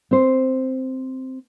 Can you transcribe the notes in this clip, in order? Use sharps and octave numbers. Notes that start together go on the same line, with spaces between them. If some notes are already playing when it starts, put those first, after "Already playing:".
C4 C5